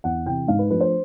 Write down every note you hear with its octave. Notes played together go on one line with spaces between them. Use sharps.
E2 F#5
C3 E3 G5
G#2 F5
B4
F3 A3 D4 B4
C5